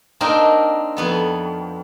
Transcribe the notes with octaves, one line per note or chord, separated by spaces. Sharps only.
A#3 C4 D4 D#4 A#4
F2 B3 A4